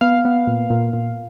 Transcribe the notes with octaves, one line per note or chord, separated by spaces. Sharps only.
B3 F5
B3
A#2
A#2
A#2